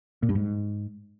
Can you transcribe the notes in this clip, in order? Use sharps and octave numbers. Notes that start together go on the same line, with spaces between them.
A#2
G2
G#2